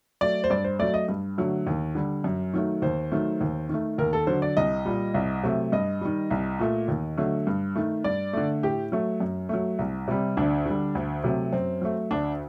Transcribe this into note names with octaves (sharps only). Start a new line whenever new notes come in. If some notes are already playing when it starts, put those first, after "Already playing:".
F#3 A3 D5
C5
G2 D5
C5
F#3 A3 D5
D#5
G2
D3 F#3 A3
D#2
D3 G3
F#2
D#3 F#3 A3
D#2 C5
D#3 F#3 A3
D#2
D#3 A3
D#2 A#4
A4
D3 F#3 C5
D5
C2 D#5
A#2 G3
C2
C3 F#3 A3
G2 D#5
D#3 G3
C2
A#2 A3
D#2
D3 F#3 A3
G2
D#3 A3
G2 D5
D3 A3
A2 G4
F#3 A3
F#2
F#3 A3
C2
C3 G3
D2 D4
D3 G3
D2
C3 F#3 A3
F#2 C4
F#3 A3
D2 D4